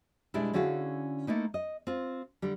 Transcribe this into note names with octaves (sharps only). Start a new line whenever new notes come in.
B2 G3 G#3 D4 E4
D3 C#4 E4 F#4 G#4 F5
A3 A#3 D#4 E4
D#5
C4 F4
D3 G3